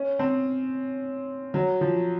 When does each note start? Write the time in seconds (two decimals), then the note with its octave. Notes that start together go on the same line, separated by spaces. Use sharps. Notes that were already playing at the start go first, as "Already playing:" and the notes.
Already playing: C#4
0.19 C4
1.54 F#3
1.81 F3